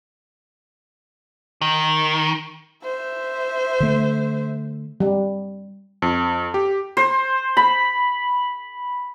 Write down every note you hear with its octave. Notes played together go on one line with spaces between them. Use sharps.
D#3
C5 E5
D3 A3
G3
F2
G4
C5
B5